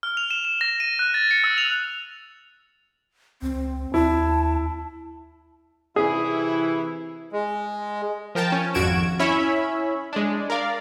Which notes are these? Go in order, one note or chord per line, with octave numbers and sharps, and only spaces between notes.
F6
F7
E7
E7
A#6
D#7
F#6
A6
C#7
E6
F7
C#2 C4
D#2 E4 A5
C3 E3 E4 G#4
G#3
F3 A#4 G5 A5
C#4
G#1 F2 F#4 G#6 D7 E7
C#4 E4 C#5 E5 B5
G#3 D4
A#4 D5 F5